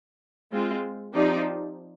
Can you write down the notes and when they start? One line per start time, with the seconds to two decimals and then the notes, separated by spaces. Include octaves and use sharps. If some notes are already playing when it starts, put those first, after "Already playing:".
0.51 G#3 C4 F4
1.14 F3 C4 D#4 G4 D5